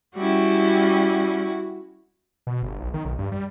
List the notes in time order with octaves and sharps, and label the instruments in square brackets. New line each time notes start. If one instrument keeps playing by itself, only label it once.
[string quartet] G3 C#4 [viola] E4 F#4
[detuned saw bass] B2
G1
B1
D#3
B1
G2
G3